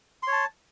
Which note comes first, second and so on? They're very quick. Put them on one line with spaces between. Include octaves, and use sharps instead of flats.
C6 C#5 A5